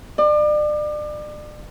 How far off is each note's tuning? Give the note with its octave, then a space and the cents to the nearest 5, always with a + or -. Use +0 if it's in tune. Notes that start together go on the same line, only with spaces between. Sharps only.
D5 +35